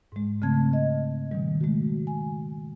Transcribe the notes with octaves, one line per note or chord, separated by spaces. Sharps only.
G#2 G#3
C#3 A3 C4 A5 G#6
D#5
B2 D#3 G3
G#3 A3 F#4
G#5